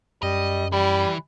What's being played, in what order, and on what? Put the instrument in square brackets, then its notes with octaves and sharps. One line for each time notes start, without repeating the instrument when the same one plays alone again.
[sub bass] F#2 [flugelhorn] G3 [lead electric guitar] D#5
[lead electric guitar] E3 [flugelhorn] G3